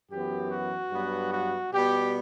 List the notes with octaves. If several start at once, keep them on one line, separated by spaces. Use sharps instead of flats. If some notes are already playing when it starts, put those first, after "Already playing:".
F#2 E3 B3 G4
F#4
G2 F#3 B3
F#4
B2 G3 B3 G4